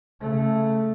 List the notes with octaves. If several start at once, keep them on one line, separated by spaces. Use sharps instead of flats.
C#3 A3